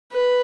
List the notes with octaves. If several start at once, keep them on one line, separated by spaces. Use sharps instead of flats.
B4